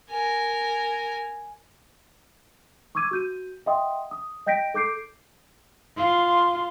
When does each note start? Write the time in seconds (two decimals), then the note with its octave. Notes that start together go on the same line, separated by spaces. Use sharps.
0.11 A#4 G#5
2.95 C#6 D6 E6 G#6 D#7
3.11 F#4 G6 D#7
3.66 D#5 E5 F#5 G5 C6 D#6
4.11 D#6
4.46 D#5 G5 G6 A#6 B6 D7
4.74 A4 D6 G6 C7 D7
5.97 F4 C6